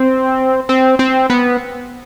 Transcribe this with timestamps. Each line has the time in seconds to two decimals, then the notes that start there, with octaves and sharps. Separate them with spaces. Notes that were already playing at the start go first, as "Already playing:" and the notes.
Already playing: C4
0.69 C4
0.99 C4
1.30 B3